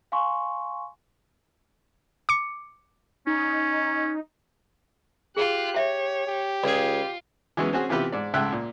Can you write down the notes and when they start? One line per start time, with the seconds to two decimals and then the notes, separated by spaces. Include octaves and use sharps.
0.12 F5 G#5 C6 C#6
2.29 D6 C#7
3.27 C#4 D#4
5.37 F4 G4 G#4 F#6
5.76 C#5 E5
6.27 G4
6.64 C#2 F4 G#4 D5
7.57 E3 F#3 G#3 B3 C#4
7.73 C4 C#4 F#4 G#4
7.89 C3 E3 B3 F4 G4 B4
8.12 G#2 D5
8.34 C#2 G#2 A3 E5 G5 F#6
8.52 A#2